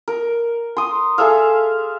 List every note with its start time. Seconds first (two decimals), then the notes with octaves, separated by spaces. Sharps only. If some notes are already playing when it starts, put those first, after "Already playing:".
0.08 A#4
0.77 C6 D#6
1.18 G#4 A4 E5 F5